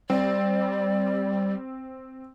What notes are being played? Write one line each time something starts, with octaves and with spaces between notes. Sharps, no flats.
G3 C4 D5